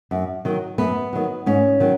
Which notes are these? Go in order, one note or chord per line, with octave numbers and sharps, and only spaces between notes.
F#2
D#3 F#3
F#2 B3
D#3 F#3
G#2 C#4
D#3 F#3